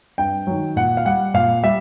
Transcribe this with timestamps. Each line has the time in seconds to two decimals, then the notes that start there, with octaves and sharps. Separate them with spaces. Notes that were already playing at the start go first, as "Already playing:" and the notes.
0.18 G2 G5
0.47 D#3 F#3
0.76 A#2 F#5
0.97 F5
1.05 G3 F#5
1.34 A#2 F5
1.63 G3 E5